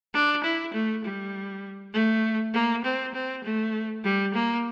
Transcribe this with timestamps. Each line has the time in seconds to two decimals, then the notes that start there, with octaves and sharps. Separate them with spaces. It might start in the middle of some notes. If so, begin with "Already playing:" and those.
0.14 D4
0.44 E4
0.74 A3
1.05 G3
1.94 A3
2.54 A#3
2.85 C4
3.14 C4
3.44 A3
4.04 G3
4.34 A#3